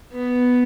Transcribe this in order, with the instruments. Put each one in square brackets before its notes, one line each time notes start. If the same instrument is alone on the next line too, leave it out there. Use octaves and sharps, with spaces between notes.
[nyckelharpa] B3